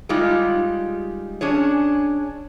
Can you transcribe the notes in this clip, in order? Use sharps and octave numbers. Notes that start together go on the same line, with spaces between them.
G3 G#3 D#4 F4 G4
C#4 D4 G#4 C#5